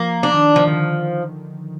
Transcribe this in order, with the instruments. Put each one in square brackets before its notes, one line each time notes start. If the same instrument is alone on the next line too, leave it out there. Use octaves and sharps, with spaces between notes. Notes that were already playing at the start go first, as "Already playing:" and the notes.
Already playing: [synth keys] F3 [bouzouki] A#3
[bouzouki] D4
[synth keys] D#3
[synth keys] D#3 [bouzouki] F3
[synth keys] D#3
D3